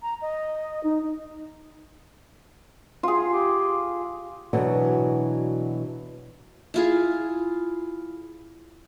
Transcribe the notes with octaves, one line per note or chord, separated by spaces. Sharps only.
A#5
D#5
D#4
F4 G#4
G4
B2 E3 F#3 B3 D4
E4 F4 G#4